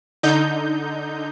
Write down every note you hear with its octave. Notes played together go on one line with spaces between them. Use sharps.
D3 D#4 G6